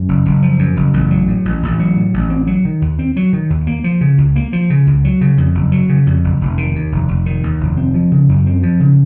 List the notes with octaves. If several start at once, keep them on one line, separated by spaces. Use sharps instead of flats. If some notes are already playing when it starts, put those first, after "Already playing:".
Already playing: F#2
F#1
F#1
F3
F#2
F#1
A1
F#3
A2
A1
A1
F#3
A2
A1
C4
F#3
D#3
D#2
C4
F#3
D#3
D#2
A#3
F3
C#3
C#2
A#3
F3
C#3
C#2
F#3
C#3
F2
F#1
F#3
C#3
F2
F#1
F1
D#3
D#2
F1
F1
D#3
D#2
F1
C4
F3
C#3
F#2
C4
F3
C#3